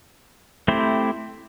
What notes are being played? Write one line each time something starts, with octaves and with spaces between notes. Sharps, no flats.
A3 C4 E4 G4 C5